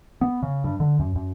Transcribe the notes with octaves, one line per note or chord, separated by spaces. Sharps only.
B3
C#3
G2
D3
F#2
F#2